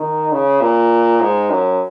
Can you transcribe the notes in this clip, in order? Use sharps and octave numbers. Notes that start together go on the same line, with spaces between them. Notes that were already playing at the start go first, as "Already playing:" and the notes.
Already playing: D#3
C#3
A#2
G#2
F#2